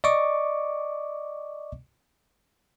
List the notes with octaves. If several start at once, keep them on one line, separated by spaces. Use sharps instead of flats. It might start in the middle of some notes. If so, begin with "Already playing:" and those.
D5 D#5 C#6 D6